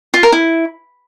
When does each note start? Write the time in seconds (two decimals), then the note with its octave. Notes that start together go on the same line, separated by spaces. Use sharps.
0.14 F4
0.23 A#4
0.32 E4